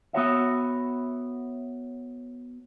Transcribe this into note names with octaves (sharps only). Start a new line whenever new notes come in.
B3 F#4 C#5 E5